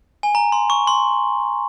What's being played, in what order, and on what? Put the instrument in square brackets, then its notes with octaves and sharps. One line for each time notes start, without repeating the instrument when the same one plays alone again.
[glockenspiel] G#5
A#5
C6
C#6
C6